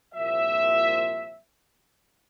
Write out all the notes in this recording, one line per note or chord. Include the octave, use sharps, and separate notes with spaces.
C2 A#2 F3 E5